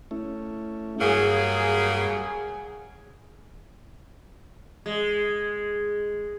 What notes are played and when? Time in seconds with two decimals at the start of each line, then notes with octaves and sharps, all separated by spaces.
0.11 A3 C#4 E4
1.01 G2 C#3 F#3 A#3 G#4
2.10 G#5
4.86 G#3